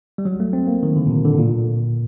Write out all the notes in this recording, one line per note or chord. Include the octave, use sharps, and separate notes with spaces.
G3
F#3
A3
C4
A#3
D#3
D3
A#2
C3
D3
A2
A#2